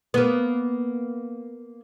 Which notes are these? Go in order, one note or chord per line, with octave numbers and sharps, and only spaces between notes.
A#3 B3